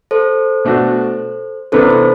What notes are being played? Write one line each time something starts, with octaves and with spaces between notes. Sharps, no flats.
A4 C5
B2 A3 D4 F#4
C3 E3 B3 D4 A4 C5
A4 C5